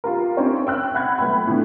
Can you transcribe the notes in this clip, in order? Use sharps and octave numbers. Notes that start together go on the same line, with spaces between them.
F4 G4 A#4
C4 C#4 D#4 G4 C#5
G5 E6 F#6
F#5 B5 F#6 G#6
B1 A3 B3 G5 B5
A2 D3